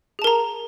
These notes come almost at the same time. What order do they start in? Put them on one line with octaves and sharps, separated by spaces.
G#4 A5 A#4 A#5